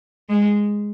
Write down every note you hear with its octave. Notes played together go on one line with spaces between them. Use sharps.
G#3